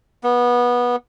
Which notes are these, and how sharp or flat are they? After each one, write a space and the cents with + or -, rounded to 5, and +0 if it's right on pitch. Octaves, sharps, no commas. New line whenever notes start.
B3 -20